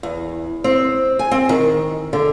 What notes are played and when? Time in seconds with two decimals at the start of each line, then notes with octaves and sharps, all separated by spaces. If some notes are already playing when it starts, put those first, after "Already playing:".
0.03 E2
0.64 C4
1.19 G#5
1.31 C4
1.49 D#3
2.13 D3